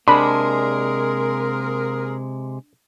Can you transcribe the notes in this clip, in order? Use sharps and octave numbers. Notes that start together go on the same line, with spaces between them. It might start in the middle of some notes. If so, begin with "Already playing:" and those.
C3 G#3 A#3 D4 G#4 A#4 B5